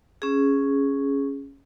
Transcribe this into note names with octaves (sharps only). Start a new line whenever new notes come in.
C#4 G#4